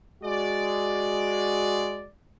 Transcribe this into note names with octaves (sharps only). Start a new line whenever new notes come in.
G#3 F#4 D5